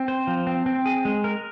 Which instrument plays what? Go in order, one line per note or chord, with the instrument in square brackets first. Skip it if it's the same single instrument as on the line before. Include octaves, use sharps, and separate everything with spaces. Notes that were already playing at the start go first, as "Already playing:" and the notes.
Already playing: [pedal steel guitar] C4
C5
F3
C4
C4
G#4
G#3
A#4